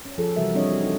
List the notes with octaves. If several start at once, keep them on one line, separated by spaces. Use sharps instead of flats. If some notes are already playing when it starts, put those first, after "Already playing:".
C#4
F3 G#4 A4
C3 E3 G3 F#4 A#4 E5
G3 C4 D4 C#5 D#5
F#4
D#4 A4